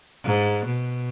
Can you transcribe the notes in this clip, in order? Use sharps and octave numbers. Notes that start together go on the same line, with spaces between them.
G#2
B2